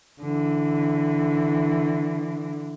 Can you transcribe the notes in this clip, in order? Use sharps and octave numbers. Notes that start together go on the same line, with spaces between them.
D3 E3